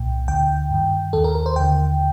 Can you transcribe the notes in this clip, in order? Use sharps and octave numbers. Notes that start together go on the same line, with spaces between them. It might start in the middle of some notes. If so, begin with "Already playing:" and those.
Already playing: C2 A#2 G5
D2 D3 G5
G2 D#3
D#2 D#3 A4
A#4
A#4
C5
D#2 D3 G5